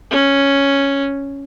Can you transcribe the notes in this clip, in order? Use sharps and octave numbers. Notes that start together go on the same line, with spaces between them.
C#4